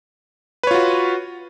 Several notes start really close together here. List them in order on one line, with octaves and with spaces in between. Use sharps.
B4 C#5 F4 F#4